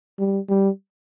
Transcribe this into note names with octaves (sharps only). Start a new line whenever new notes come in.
G3
G3